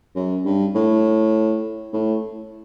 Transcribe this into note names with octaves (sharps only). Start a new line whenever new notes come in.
F#2
G2
A2
A2